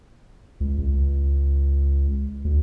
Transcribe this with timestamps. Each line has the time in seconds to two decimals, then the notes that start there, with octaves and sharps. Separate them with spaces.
0.60 C#2
0.78 C#2
2.45 D2